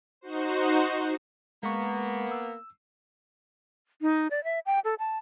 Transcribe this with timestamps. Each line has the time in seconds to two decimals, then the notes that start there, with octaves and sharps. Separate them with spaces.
0.21 D#4 F#4 C5
1.63 G#3 A#3 B3 C#6
2.31 E6
4.02 D#4
4.31 D5
4.44 E5
4.66 G5
4.85 A4
4.99 A5